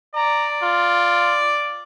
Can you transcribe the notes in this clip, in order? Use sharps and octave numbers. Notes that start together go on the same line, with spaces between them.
D5 A#5
F4